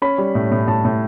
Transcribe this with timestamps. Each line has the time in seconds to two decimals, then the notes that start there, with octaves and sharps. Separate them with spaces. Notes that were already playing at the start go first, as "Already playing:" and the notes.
0.02 C#4 B5
0.18 G3
0.35 A2
0.51 A2
0.68 A2 A5
0.85 A2